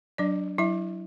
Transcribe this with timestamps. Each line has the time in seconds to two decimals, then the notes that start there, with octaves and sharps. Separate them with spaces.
0.18 F#3 D4 D5
0.58 F#3 E4 E5